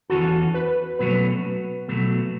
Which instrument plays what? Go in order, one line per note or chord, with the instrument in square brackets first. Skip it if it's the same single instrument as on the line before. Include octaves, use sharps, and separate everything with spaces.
[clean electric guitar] E2 E3 C#4 A4 [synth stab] F#4
[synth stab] B4
[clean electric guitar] B2 F#3 A3 C#4 [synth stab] B4
[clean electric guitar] B2 F#3 A3